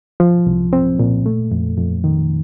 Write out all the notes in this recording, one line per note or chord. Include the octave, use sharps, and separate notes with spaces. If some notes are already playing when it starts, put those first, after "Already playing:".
F3
C2
C4
A#2
A3
F2
F2
D#3